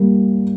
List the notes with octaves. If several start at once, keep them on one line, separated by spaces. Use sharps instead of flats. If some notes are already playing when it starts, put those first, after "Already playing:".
Already playing: G3 A#3